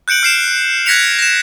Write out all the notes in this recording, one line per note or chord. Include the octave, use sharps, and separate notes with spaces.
F#6 G6 C#7 D7 F#7
F6 C7 E7
F#6 G#6 A#6 B6 C#7 F7
A#6 E7